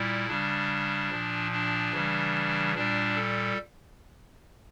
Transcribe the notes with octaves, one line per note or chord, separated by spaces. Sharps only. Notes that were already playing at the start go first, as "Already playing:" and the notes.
Already playing: A#2 G3 E4
C#3 G3 D4
A#2 F3
D4
C#3 E3 G3
A#2 G3 D4
A4